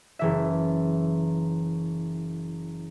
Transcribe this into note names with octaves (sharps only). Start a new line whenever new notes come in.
F#1 E3 E5